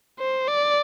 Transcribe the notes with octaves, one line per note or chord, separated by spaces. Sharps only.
C5
D5